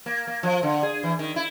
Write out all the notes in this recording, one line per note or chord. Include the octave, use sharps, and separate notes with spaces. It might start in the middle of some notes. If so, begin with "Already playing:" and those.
A#3
A#3
F3
D3
G#4
E3
D#3
E4